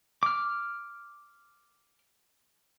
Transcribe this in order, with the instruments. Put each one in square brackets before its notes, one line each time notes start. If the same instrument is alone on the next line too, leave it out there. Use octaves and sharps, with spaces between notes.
[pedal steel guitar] D6 F6